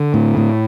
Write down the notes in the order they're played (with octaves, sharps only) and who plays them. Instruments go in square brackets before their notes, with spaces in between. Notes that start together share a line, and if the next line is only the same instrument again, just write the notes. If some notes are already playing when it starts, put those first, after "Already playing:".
Already playing: [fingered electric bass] D3
A2
A2